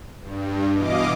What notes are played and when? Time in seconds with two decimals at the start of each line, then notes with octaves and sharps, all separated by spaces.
0.21 G2
0.74 B2 E3 D#5 F5 D6